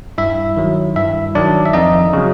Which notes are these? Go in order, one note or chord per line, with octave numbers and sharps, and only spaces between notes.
G2 E4 E5
D#3 F#3
G2 E4 E5
D#3 F#3 D4 D5
E5
F2 D#4 D#5
C#3 F#3